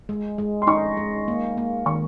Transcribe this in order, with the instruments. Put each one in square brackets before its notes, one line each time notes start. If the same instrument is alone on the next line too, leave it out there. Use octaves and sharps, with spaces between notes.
[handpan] G#3
G#3
[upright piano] C6
[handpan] D#4 [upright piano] C#6
[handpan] G#3
A#3
A#3
[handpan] D#3 [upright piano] C#6